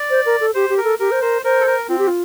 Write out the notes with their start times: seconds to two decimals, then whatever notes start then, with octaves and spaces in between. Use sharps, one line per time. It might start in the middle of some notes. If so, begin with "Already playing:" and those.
Already playing: D5
0.10 C5
0.26 A#4
0.41 A4
0.54 G4 C5
0.70 G4
0.78 A#4
0.84 A4
0.99 G4 A#4
1.11 C5
1.22 A#4 C5
1.44 A#4 C5
1.61 A4
1.67 A#4
1.89 C4 F4
1.98 G4
2.07 F4